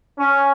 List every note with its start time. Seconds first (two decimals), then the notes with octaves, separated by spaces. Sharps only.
0.17 C#4